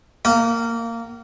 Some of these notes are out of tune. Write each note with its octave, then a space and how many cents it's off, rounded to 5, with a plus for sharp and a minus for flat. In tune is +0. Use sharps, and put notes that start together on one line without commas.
A#3 -15 F#5 +45